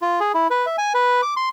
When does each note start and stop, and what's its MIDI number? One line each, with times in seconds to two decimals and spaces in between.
0.02 0.20 65
0.20 0.32 68
0.34 0.47 64
0.50 0.66 71
0.66 0.76 76
0.78 0.93 80
0.94 1.21 71
1.22 1.34 86
1.37 1.49 84